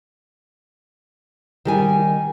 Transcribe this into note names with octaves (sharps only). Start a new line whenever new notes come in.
D#3 G3 G#5